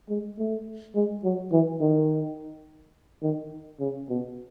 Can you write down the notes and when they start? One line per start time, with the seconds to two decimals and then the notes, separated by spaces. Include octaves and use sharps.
0.09 G#3
0.38 A3
0.95 G#3
1.24 F#3
1.52 E3
1.80 D#3
3.23 D#3
3.80 C#3
4.09 B2